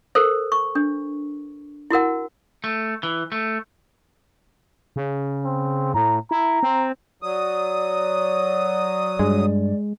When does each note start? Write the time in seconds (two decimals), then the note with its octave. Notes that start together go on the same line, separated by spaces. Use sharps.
0.15 A4 A#4 C5
0.52 C#6
0.75 D4
1.90 E4 F#4 A#4 F#5
2.64 A3
3.03 E3
3.32 A3
4.96 C#3
5.45 C4
5.94 A2 A#5
6.31 E4 A#5
6.63 C4
7.23 F#3 D5 D#6
9.19 G2 G#3